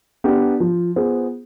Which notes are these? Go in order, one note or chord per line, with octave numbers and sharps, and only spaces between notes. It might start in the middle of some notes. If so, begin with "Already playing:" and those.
B3 D4 G4
F3
B3 F4 G#4 C5